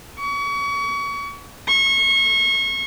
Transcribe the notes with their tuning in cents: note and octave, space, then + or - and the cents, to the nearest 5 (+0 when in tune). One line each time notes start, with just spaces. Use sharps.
C#6 +35
C#6 -30